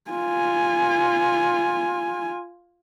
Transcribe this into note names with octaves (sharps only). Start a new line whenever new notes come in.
F4 G#5